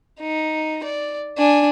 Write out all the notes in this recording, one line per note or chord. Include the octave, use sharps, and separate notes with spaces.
D#4
D5
D4 G#5